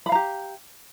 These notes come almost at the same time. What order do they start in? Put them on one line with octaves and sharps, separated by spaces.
B5 F5 A#5 G4